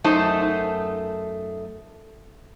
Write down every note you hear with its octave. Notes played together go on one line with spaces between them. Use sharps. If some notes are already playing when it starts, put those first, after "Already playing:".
F#2 A3 D#4 C5 A5